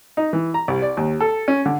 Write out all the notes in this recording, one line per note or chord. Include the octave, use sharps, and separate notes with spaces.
D#4
E3
A#5
C2
D5
D#2
A4
C#4
D3